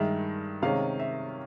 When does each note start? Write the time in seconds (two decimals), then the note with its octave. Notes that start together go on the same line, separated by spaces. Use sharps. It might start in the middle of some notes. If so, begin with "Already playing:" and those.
Already playing: G2 D#3 G#3 E5
0.62 C3 D#3 G#3 C#4 F5
1.00 E5